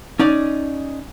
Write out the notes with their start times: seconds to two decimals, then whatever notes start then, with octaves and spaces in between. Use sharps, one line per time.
0.19 C#4 D#4 D5